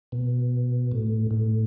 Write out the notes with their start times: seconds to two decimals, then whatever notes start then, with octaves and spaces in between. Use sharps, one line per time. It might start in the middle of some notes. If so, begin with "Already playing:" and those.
0.12 B2
0.91 A2
1.31 A2